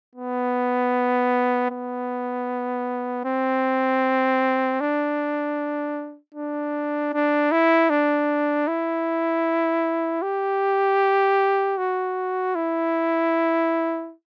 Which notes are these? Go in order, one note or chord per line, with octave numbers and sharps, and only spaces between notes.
B3
B3
C4
D4
D4
D4
E4
D4
E4
G4
F#4
E4